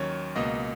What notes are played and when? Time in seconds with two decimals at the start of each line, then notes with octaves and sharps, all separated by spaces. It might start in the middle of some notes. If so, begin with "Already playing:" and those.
Already playing: D#2 D#3 F#3 C#4 C#5
0.36 C#2 B2 A#3 D#5